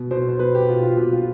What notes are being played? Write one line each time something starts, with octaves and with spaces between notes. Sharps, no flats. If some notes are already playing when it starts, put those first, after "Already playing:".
Already playing: B2
B2 C5
C5
B2 B4
G4
B2 F4
F4
B2 G4
F4